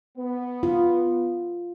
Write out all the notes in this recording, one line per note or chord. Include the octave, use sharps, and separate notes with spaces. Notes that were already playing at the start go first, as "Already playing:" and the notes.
B3
F4